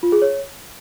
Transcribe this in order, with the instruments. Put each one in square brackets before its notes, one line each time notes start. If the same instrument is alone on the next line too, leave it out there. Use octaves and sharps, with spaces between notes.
[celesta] F4
G#4
C#5